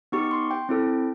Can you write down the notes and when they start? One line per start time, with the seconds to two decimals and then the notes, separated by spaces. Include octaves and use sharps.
0.12 B3 D#4 G4 C#6
0.31 C6
0.51 G5
0.69 C4 E4 A4